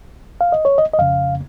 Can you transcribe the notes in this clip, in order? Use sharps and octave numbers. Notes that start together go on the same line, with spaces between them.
F5
D#5
C#5
D#5
D#5
F2 C#3 F5